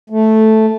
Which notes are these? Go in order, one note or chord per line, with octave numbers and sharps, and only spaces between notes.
A3